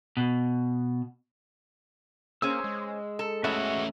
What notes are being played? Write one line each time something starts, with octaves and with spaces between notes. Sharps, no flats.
B2
A#3 C#4 G#4 C5 E6
G#3
A4
E2 A3 C#4 F#4 E5